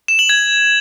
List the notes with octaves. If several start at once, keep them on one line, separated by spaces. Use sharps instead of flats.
E7
F#7
G#6